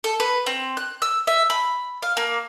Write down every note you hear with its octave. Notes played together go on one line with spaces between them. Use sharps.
A4
B4
C4
F#6
E6
E5
B5
F5
A#3